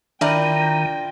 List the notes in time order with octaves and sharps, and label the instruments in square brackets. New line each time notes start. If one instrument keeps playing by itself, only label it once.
[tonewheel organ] D#3 [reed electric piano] D4 D5 [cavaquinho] E4 A#4 A#5 [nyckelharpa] F4 G5